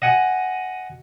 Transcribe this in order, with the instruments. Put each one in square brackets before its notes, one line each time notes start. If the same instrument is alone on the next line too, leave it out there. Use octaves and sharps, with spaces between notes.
[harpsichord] D#5 F#5 G#5 D#6